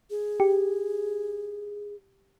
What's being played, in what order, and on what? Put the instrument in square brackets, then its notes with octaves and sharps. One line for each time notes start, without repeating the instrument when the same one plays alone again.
[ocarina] G#4
[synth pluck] G4